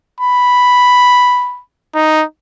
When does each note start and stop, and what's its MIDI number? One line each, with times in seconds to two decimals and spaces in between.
0.20 1.61 83
1.95 2.23 63